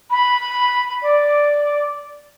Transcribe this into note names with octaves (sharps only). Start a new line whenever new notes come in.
B5
D5